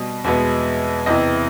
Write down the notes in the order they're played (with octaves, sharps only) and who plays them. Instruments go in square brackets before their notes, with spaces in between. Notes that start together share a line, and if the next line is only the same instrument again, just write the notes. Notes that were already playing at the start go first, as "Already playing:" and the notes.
Already playing: [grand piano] B2 G3 B3 D#5
E2 B2 G#3 B3
E2 C3 E3 D#5